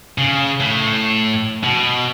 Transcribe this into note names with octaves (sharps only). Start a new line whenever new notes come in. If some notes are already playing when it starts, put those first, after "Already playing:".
C#3
A2
B2